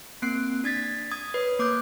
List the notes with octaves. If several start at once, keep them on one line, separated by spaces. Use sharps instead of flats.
A#3 C4 F#6 C7 D7
D4 G#6 A6 B6
D#6 G#6
B4 C#5 D#6
A#3 D6 F#6 G6